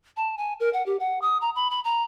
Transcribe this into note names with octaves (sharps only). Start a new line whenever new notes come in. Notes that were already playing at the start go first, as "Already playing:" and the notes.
A5
G#5
A#4
F#5
G4
F#5
D#6
A#5
B5
B5
A#5